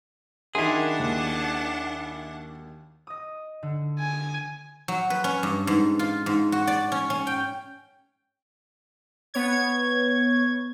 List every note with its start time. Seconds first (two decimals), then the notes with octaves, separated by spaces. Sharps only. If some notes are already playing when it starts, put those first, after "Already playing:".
0.55 F#2 D#3 D4 E4 G#4 F#5 C6
1.00 D#2
3.07 D#5 D#6
3.63 D3
3.99 G#5
4.88 F#3
5.10 B4
5.24 C#4
5.43 G2
5.67 G#2
5.99 F4
6.26 G#2
6.52 F#4
6.67 D5
6.92 C#4
7.10 C#4
7.27 G5
9.34 B3 C#5 G#6